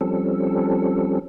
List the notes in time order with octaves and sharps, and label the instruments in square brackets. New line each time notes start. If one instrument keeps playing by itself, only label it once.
[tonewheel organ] F3 G3 C4 C#4 A4